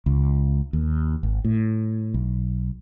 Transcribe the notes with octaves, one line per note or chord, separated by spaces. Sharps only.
C#2
D#2
G#1
A2
B1